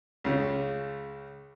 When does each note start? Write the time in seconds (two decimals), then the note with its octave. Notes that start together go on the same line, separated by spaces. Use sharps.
0.24 C#2 C#3